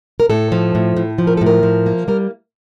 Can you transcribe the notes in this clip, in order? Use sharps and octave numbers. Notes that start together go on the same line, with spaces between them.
A#4
A2 A4
F3
A2
A2
F3
A#4
A4
A2
A#4
F3
A#3
G3 A#4